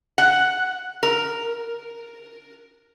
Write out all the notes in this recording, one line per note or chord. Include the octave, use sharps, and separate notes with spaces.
F#5
A#4